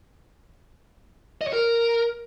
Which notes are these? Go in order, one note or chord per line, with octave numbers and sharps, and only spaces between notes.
D#5
C#5
A#4